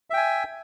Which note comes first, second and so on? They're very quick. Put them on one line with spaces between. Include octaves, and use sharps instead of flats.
E5 G5 G#5